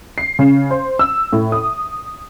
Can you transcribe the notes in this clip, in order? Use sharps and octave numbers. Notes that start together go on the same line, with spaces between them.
C7
C#3
C5
E6
A2
D#6